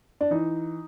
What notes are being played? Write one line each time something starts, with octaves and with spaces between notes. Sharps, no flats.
D4
E3 D#4